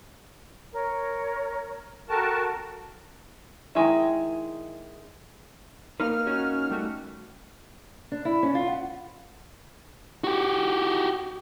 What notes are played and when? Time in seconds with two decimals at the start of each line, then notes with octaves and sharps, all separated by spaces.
0.73 A#4 C#5
2.09 F#4 A4 A#4 G5 A5
3.75 D#3 E3 G#3 E4
6.00 A#3 D#4 B4 F6
6.27 C#4 F#4
6.70 G3 A3 F#4
8.12 D4
8.25 E4
8.43 C#4
8.55 F4
8.68 F#5
10.24 F#4 G4